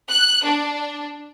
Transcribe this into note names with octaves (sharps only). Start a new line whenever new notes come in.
F#6
D4